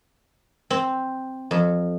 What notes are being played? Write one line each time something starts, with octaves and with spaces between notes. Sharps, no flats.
C4
F2